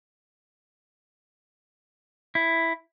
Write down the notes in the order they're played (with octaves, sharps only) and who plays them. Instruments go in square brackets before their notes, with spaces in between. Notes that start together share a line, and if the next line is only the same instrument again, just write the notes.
[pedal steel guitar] E4